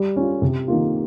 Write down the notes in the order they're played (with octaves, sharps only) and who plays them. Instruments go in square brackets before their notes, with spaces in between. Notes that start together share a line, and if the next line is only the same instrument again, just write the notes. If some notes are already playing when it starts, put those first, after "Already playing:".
Already playing: [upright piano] G3
C#4 F4
C3
D#3 A#3 F4